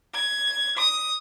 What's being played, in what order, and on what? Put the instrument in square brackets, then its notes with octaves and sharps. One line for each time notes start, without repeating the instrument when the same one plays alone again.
[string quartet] G#6
D#6